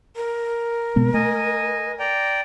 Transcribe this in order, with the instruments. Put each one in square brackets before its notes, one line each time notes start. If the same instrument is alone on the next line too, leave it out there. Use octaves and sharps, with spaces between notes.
[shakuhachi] A#4
[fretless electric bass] B2 G#3 B3
[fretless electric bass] A3 [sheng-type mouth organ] D#5 G#5
[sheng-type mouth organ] D5 G5 A#5